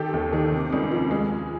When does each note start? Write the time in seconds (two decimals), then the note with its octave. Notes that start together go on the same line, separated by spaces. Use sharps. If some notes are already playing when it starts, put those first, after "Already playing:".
Already playing: D#3 G4 A4
0.13 D#2
0.33 D#3
0.52 C3
0.73 C#2
0.92 F3
1.11 G#3